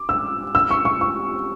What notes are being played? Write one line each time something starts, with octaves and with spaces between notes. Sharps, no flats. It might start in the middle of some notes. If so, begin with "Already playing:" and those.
Already playing: D6
E6
E6
C#6
C#6
C#6